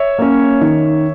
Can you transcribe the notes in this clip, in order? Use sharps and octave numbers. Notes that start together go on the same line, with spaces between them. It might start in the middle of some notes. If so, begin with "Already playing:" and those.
Already playing: C#5 E5
A#3 C#4
D#3